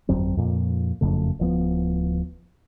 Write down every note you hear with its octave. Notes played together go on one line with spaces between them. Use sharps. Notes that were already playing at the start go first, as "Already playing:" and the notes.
G1 F2 F#3 C4
F2 A#2
F#1 F2 C#3 A3
D1 F3 B3